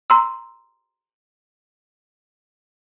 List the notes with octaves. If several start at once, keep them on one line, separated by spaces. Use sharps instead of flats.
A#5 C6 E6